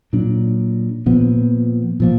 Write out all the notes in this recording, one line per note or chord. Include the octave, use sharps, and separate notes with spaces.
A#2 F#3 D4
A#2 F3 B3
A#2 F3 A#3